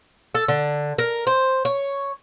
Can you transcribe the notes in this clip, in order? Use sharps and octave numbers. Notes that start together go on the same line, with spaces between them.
A4
D3
A#4
C5
C#5